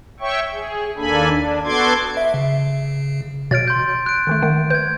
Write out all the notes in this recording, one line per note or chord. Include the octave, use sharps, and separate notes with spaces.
C#5 E5 G5 C#6
G#4
D#2 A#3 D4 A4 G#5 B5
D4
B3 F#4 A4 C6 D6 G#6
E5
C#3
B2 C#5 F6 A6 D7
C6 G6
F#6 D7
D3 D#3 A3
D#3 A3 F#5
B4 G6 G#6